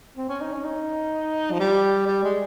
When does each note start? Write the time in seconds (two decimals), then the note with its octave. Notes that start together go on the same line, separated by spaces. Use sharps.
0.17 C4
0.29 C#4
0.41 D#4
0.53 C#4
0.64 D#4
1.52 F3
1.59 G3
2.07 G3
2.23 G#3